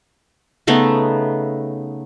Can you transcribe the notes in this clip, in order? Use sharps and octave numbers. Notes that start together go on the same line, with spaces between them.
C#3 A3 B3 D#4